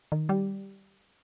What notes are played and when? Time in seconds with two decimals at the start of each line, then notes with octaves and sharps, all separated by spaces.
0.12 D#3
0.29 G3